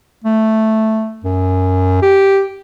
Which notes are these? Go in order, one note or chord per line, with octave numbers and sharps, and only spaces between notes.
A3
F#2
G4